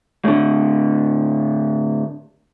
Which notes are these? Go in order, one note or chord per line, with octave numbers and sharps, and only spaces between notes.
A2 D3